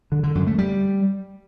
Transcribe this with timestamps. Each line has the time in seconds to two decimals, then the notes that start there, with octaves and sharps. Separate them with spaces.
0.12 D3
0.23 D3
0.35 F#2
0.47 A3
0.58 G3